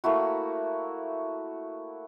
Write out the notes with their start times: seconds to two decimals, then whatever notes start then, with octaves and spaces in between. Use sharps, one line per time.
0.04 A3 A#3 E4 F#4